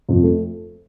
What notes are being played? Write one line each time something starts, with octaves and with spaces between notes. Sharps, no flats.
F2
A3